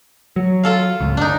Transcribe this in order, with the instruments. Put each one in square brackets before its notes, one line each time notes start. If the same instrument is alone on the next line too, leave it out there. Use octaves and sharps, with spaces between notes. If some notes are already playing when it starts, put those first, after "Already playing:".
[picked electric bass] F#3
[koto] F4 A4 F5
[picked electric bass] G#1 C#2
[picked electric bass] G1 [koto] D4 D#4